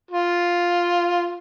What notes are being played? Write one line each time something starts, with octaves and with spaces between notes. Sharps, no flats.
F4